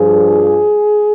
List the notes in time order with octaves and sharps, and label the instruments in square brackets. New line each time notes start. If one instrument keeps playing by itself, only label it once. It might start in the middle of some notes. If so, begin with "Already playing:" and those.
Already playing: [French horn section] G2 F3 G#4